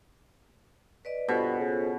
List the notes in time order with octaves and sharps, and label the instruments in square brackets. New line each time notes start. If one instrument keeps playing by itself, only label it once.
[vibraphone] B4 D5 D#5
[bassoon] G2 [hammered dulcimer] B2 [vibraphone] F4 A4 C5
[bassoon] C#3